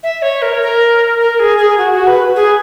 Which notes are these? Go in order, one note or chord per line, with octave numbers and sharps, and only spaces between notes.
E5
C#5
A#4
A#4
A#4
G#4
G#4
F#4
F#4
B4
G#4